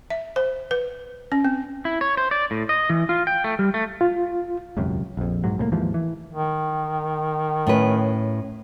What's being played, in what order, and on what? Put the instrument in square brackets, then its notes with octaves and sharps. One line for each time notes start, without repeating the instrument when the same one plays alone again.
[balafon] E5
C5
B4
C#4
C4
[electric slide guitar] E4
C#5
C5
D5
A2
D#5
E3
F4
G5
A3
G3
A3
[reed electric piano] F4
[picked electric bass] E1 C#2 F#2 C3
A#1 F2
B1 G#2 F#3
C2 A2 G3 A#3
D#2 G#2 E3 F3
E3
[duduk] D#3
[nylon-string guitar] A2 C#4 B4